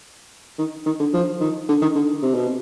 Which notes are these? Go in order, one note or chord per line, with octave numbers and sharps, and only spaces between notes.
D#3
D#3
D3
F3
D#3
D3
D#3
D3
C3
B2